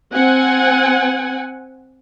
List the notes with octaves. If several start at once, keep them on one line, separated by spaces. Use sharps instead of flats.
C4 F#5 G#5